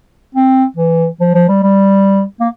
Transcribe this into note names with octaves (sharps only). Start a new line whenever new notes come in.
C4
E3
F3
F3
G3
G3
A#3